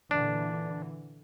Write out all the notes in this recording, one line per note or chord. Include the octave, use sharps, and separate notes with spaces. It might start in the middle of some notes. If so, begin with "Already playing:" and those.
A#2 D3 E3 D4